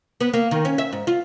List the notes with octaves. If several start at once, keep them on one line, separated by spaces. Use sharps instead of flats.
B3
A#3
D#3
C#4
E5
G#2
F4